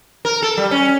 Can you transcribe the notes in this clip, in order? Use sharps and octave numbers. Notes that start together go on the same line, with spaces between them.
A#4
A4
G3
C#4